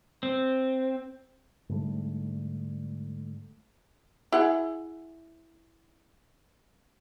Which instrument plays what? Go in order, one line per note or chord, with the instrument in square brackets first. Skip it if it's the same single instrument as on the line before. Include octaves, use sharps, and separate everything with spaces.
[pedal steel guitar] C4
[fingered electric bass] G#2 D3 G3 A3
[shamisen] E4 G#4 F#5